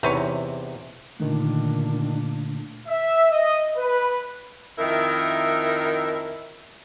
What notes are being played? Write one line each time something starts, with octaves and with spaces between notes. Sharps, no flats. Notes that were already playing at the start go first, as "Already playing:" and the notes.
E2 C3 D#4 B4 C#5
A#2 D3 D#3 A3 D4
E5
D#5
B4
F2 D#3 E4 A#4 E5